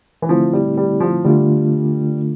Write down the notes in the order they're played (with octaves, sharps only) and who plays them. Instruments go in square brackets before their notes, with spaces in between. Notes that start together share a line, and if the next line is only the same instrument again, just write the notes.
[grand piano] E3
[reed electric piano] D3 A3 C4 E4 [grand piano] F3
[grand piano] G3
G3
F3
[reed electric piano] D3 A3 D4 F4 [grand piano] G3